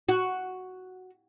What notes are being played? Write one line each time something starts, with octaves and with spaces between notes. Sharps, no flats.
F#4